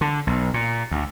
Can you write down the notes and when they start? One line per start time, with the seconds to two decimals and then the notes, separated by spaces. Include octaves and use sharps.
0.01 D3
0.27 B1
0.54 A#2
0.91 D2